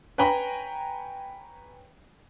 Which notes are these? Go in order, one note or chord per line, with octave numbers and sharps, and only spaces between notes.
B4 C#5 G5 G#5 A#5 B5